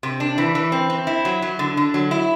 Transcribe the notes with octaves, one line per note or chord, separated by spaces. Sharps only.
C3
D4
E3
E3
C4
C4
E4
F#3
F#3
D3
D3
F#3
E4